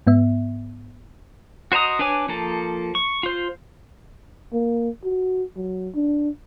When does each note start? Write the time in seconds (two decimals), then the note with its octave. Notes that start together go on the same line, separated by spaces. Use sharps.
0.07 G#2 B3 E5
1.72 F#4 C5 D#5 A#5 D#6
1.99 D4 B4 C#5 G#5 D6
2.28 F3 A#3 A4
2.95 C#6
3.23 F4 C5
4.53 A#3
5.04 F#4
5.56 F#3
5.94 D4